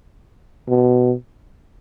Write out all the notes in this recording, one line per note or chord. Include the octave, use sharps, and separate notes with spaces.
B2